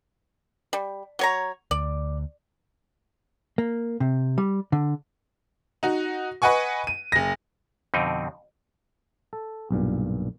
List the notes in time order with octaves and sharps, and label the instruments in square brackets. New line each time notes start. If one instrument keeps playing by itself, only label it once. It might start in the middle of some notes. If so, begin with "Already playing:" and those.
[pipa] G3
F#3 C#5 A#5
[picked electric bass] D2 [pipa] D5
[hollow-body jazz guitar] A#3
C3
G3
D3
[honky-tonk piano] D#4 F#4
B4 D#5 F#5 G#5 C#6
D#7
F#1 A#6
[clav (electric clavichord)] F2 B2 D3 C4 D#4
A4
B1 G2 A#2